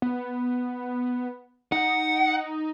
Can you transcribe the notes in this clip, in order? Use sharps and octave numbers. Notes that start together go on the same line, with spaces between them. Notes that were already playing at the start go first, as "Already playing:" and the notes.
B3
D#4 F#5